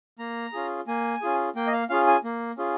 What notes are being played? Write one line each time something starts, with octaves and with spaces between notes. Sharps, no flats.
A#3 A#5
C#4 F4 G#4
A#3 G#5
C#4 F4 G#4
A#3 G5
D#5
F5
C#4 F4 G#4 F5
G#5
A#3
C#4 F4 G#4